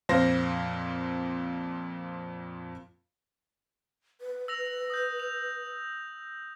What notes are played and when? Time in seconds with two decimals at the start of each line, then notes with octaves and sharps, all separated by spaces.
0.09 F2 A#2 C5 F5 A#6
4.21 B4
4.48 E6 A#6 F7
4.90 D#6 G6
5.20 F7